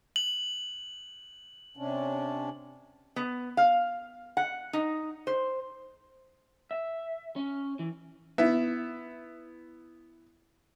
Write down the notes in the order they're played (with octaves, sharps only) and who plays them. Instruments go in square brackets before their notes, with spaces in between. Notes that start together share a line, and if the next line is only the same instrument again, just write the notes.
[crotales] F#7
[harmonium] C3 C#4 D4
[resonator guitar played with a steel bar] B3
F5
F#5
D#4
C5
[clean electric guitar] E5
C#4
E3
[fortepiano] B3 E4 E5